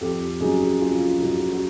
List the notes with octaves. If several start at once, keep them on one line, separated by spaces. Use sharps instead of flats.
F2 G4 A4
C#3 F#3 A#3 D#4 F#4 G#4
F2 F4 G4
C#3 F#3 A#3 D#4 F#4
G4
F#4
F#4